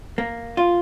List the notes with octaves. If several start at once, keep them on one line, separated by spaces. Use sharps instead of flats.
A#3
F4